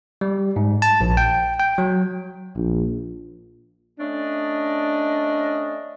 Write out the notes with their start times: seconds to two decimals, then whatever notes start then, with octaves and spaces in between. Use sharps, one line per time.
0.21 G3
0.56 G#2
0.82 A5
1.01 A#1
1.17 G5
1.60 G5
1.78 F#3
2.56 A#1
4.00 A3 C#4 D4 D#5